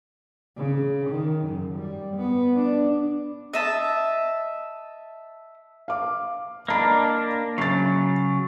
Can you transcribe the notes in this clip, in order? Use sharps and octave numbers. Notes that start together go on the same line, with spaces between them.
C#3
D#3
F#2
G3
B3
D4
D#5 E5 A5
F5 D6
A#3 D4 D#5 A#5 B5
C#3 F#3 A6 C7